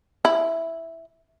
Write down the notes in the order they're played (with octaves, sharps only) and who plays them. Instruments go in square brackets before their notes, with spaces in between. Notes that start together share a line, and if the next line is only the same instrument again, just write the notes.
[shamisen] E4